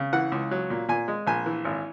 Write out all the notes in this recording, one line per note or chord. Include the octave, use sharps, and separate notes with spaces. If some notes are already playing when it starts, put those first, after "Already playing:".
Already playing: C#3
E3 F#5
C#2
F#3
A#2
A#2 G#5
G#3
A#1 G#5
E3
G#1